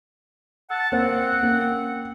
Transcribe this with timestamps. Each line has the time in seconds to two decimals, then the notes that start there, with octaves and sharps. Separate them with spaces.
0.70 F#5 A5
0.92 A#3 C4 C5 F#5
1.43 A#3 C#4